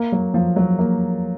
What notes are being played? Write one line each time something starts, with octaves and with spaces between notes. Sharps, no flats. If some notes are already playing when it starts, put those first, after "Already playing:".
Already playing: A#3
F#3
F3
F#3
A#3